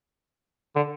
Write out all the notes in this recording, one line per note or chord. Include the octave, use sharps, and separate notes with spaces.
D3